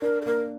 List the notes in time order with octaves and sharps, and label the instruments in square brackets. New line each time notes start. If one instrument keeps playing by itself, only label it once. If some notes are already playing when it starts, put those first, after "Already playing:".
[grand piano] D4 [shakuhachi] A#4
[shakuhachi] A4
[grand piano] A#3 [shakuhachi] A#4